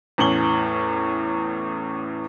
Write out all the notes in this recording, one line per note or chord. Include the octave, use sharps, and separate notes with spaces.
E2 A2 C#4 F#7 G7